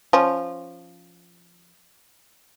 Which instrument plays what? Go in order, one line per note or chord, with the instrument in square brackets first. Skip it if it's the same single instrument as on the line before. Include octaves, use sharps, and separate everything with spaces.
[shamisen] F3 C#4